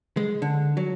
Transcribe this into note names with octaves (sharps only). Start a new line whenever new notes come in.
G#3
D3
F#3